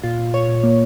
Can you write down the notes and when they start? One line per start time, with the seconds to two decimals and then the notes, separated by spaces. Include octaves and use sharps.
0.03 A#2 F4
0.19 A#2
0.34 A#2 C#5
0.49 A#2
0.64 A#3